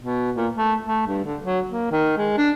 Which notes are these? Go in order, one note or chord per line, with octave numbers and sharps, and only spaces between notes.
B2
A#2
A3
A3
G2
D3
F#3
A#3
D#3
G#3
D4